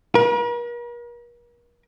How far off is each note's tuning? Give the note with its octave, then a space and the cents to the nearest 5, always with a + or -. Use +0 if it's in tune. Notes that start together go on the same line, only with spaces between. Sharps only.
A#4 +45